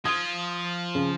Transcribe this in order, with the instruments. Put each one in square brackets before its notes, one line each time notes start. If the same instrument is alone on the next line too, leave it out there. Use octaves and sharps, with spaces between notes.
[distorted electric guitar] F3 F4 [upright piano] D#6 G#6
[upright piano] C#3